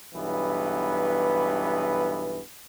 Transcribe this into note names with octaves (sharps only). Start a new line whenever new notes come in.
B1 G2 E3 B3